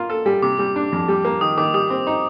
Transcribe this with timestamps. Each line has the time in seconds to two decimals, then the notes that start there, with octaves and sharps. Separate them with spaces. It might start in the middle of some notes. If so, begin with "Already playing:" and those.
Already playing: A#3 F4
0.10 A4
0.26 G3
0.42 C3 D6
0.59 G3
0.76 D4
0.92 F2
1.08 G3
1.25 A#3
1.41 D#3 D#6
1.57 D#3 D6
1.74 G3 D#6
1.90 C4
2.07 D#4